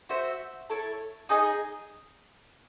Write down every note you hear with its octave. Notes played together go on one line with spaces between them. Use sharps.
F#4 C5 E5
E4 A4 C#5
D#4 G#4 D#5